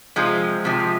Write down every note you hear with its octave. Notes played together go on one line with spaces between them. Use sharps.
C3 F3 G#3
C3 F3